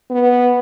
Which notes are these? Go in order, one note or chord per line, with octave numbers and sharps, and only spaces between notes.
B3